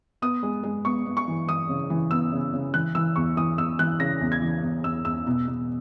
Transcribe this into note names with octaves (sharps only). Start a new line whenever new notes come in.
B3 D#6
G#3
G#3
B3 C#6
B3
C#6
E3
E3 D#6
C#3
E3
B3 E6
C#3
C#3
E3 F#6
E3 E6
E2 C#6
E3 D#6
E2 E6
E3 F#6
C#3 A#6
E2
G#6
E3
E2
E2 E6
E2 E6
B2
B2